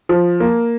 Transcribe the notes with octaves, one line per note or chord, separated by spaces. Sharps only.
F3
A#3